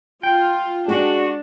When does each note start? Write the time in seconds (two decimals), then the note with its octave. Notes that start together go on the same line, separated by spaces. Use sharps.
0.23 F4 G5
0.88 G#3 D4 F#4